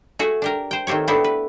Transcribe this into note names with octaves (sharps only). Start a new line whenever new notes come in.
A3 F#4 G#4
D4 G4 A#4
C5 G5
D#3 A3 C4 G4 C#5
A3 B3 C4 D4 E4 A4
B4